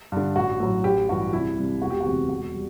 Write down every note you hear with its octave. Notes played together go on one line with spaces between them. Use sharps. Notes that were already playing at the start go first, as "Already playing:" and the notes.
G2 D3
A1 F#4
A2 F#3
A1 G4
G2 E3 F#4
C2 E4
C3 G3
E1 F#4
G4
D2 C3 E3 F#4
E1 F#4
G3